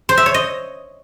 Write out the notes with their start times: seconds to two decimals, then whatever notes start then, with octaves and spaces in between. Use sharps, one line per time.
0.09 C5
0.17 E5
0.26 C#5
0.34 D#5